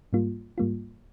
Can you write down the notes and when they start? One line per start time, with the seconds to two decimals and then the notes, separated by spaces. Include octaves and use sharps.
0.13 G#2 G3 A#3 F4
0.58 G#2 G3 A#3 F4